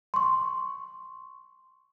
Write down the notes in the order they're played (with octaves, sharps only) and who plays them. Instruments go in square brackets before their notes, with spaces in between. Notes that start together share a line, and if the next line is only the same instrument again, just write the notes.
[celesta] C6 C#6